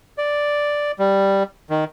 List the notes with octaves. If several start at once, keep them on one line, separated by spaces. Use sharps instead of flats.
D5
G3
D#3